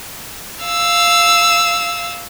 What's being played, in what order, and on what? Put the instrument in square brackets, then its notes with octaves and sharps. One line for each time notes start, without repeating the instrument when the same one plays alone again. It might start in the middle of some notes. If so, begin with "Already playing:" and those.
[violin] F5 E6